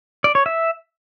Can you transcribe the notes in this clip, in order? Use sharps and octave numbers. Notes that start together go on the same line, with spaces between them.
D5
C#5
E5